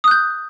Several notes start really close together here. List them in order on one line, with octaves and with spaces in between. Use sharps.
D#6 F#6 G6